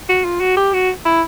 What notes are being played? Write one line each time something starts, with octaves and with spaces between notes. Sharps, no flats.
F#4
F4
F#4
G4
F#4
E4